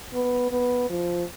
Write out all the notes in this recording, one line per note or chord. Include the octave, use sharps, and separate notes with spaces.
B3
B3
F3